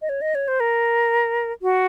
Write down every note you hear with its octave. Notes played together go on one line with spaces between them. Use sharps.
D#5
C#5
D#5
C#5
C5
A#4
F#4